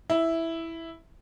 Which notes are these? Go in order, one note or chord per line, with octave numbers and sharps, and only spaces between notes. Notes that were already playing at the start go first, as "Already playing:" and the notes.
E4